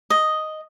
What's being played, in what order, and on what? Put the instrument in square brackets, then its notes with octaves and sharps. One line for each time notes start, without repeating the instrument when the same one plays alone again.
[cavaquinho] D#5